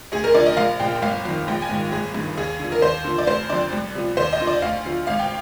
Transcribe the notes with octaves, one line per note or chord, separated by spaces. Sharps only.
D2 G#4
A#4
D3 F3 D5
D#5
A#1 F5
A#2 F3 G5
G1 F5
F2 D#3
A#1 G5
G#5
G#2 D#3
G1 G#4
G2 D#3
D#2 G#4
D3 F3
A#4
D#2 C5
D3 F3
D5
F1 C5
F2 D3 D5
C2
C3 F3
D#2 C5
D#5
D3 F3
D5
D2 F5
D3 F3
G#1 F5
G5